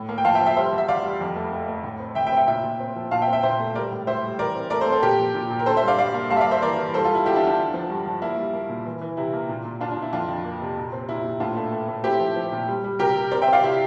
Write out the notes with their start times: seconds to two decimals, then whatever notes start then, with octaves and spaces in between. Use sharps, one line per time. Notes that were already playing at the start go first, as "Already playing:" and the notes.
Already playing: A2
0.09 A#3
0.18 G5
0.25 F3 F5 A5
0.35 E5 G5
0.41 F3
0.46 E5 G5
0.56 G3 C5 E5
0.72 E2
0.78 E5
0.88 E2 D5 F5
1.04 G3
1.21 F2
1.36 A3
1.52 A3
1.68 A3
1.84 A2
2.00 C4
2.15 A2 E5 G5
2.27 E5 G5
2.32 C4
2.37 E5 G5
2.47 A#2 E5 G5
2.63 A#2
2.80 C4
2.96 F3
3.11 A#2 F5 A5
3.22 E5 G5
3.27 C4
3.33 E5 G5
3.43 A#2 C5 E5
3.59 A3
3.75 G3 A#4 D5
3.91 A2
4.07 A2 C5 E5
4.23 G3
4.39 E3 A#4 D5
4.55 C4
4.70 A3 A#4 D5
4.81 A4 C5
4.87 C4
4.92 A4 C5
5.03 A#2 G4 A#4
5.19 F3
5.35 A#2
5.50 A#2
5.59 A#4
5.66 D3 A4 C5
5.77 C5 E5
5.82 G2
5.88 D5 F5
5.98 G3 D5 F5
6.14 A#3
6.30 G2 F5 A5
6.37 E5
6.41 D5 F5
6.47 A#3 C5 E5
6.62 E3 A#4 D5
6.78 E3
6.94 G3 A4 C5
7.05 F4 A4
7.10 G3 E4
7.26 E2 E4 G4
7.36 D4 F4
7.42 E2
7.47 D4
7.58 D3
7.74 F3
7.90 G2
8.06 F3
8.22 A#3 E4
8.37 G3
8.53 A#3
8.69 A#2
8.85 E3
9.01 E3
9.17 C3 E4
9.33 A#3
9.49 A#2
9.65 A#2
9.81 A#2 D4 F4
9.91 D4
9.97 A#2
10.02 E4
10.13 F2 D4 F4
10.29 F2
10.44 A#3
10.61 C3
10.77 A#2
10.93 C4
11.09 A#2 E4
11.24 A#2
11.40 A2 D4 F4
11.57 A3
11.72 A3
11.88 A3
12.04 C4 E4 G4
12.20 F3
12.36 F3
12.52 A#2
12.68 G3
12.84 G3
12.99 C3 G4 A#4
13.16 C3
13.31 C4 A#4 D5
13.42 E5 G5
13.48 C4 D5 F5
13.63 C3 E4 G4